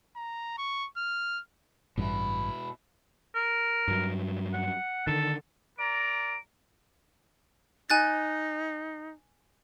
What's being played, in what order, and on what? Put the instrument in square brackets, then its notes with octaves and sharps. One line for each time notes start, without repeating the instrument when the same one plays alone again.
[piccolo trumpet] A#5
C#6
F6
[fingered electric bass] A1 G2 [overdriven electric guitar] B2 E4
[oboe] A#4
[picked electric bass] G2 F#3
[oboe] F#5
[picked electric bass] D3 D#3 [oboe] A4
[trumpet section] A#4 D5 A#5 [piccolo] D7
[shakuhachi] D#4 [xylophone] G#5 F#6 A6